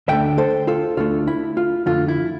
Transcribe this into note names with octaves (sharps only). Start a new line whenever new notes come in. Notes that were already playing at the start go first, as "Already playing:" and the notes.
D2 D3 A3 E5 G5
A4 C5
F4 A4
D2 D3 A3 F4
E4
F4
F2 D3 A3 F4
E4